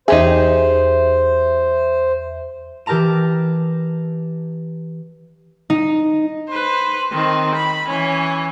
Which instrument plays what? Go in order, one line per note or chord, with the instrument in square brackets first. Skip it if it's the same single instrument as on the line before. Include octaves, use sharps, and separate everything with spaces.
[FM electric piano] E2 E5 [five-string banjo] D#4 G4 G#4 [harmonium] C5
[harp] E3 G4 A#4 A5 A#5 E7
D#4
[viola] B4 C5
D#3 C4
B5
E3 C#4